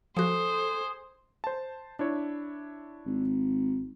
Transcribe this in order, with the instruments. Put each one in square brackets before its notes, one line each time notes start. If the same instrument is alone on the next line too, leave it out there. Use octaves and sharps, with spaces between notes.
[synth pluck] F3 F#4 [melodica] G#4 [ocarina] A4 [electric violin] C5
[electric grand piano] C5 A5
D4 E4 C#5
[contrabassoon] G#1